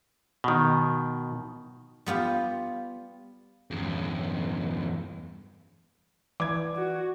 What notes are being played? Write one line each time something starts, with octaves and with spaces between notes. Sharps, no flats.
B2 D#3
G3 B3 F4 G4
E2 G2
E3 D5 D6 G#6
F#4